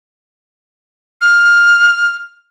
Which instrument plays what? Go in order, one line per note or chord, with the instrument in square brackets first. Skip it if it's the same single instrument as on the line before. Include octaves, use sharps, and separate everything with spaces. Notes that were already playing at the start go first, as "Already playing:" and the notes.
[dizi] F6